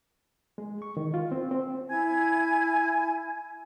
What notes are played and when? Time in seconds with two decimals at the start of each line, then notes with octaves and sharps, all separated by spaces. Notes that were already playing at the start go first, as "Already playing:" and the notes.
0.58 G#3
0.82 C#6
0.97 D#3
1.14 F4
1.32 C4
1.51 C4
1.89 E4 G#5 G#6